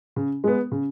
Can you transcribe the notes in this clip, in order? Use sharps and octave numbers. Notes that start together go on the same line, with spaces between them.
C#3
G#3 B3
C#3